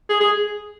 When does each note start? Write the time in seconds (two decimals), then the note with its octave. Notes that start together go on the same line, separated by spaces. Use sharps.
0.09 G#4
0.20 G#4